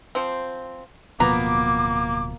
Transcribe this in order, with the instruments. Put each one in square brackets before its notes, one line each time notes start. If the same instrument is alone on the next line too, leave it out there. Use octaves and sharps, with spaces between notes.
[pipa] F3 C4
[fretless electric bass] D1 B2 F3 [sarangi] A#3 [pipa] B3 A#5 [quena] D6